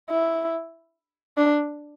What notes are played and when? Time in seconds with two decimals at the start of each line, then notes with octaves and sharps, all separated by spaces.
0.10 E4
1.37 D4